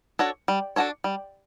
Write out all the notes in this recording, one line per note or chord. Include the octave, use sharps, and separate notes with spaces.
D4 F#4 A4 C#5
G3
D4 F#4 A4 C#5
G3